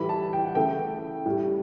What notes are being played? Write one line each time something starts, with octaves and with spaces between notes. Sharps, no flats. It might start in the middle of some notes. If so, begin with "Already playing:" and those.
Already playing: A2 E3 G3 B5
A5
G5
F#5
C#3 E3 A3 G5
A2 G3